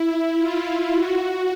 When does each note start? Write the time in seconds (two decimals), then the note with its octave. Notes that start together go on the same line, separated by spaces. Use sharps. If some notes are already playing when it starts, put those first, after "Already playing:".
Already playing: E4
0.39 F4
0.93 F#4